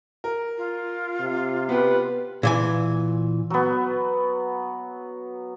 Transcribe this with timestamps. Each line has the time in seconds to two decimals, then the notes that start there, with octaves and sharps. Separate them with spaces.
0.24 A#4
0.57 F4
1.20 C3
1.69 B3 G4 B4
2.43 A#2 E3 G#5
3.50 F#3 B3